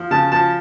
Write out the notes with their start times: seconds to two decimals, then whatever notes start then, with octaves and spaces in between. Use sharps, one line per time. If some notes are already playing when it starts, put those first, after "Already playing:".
Already playing: F3
0.11 C#3 A5
0.32 F3 A5